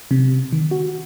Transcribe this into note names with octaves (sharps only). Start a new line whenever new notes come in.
C3
D#3
F#4